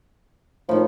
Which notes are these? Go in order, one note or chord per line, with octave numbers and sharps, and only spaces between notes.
A2 D#3 F3